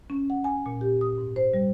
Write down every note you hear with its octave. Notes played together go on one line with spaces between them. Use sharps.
C#4
F#5
G#5
A#2
G4
D#6
G#2
C5
G3